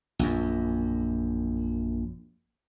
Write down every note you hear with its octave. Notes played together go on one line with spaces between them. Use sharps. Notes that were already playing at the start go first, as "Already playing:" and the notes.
A#1 F#2